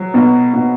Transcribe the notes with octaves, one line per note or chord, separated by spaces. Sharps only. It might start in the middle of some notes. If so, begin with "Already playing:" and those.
Already playing: F#3
B2
B2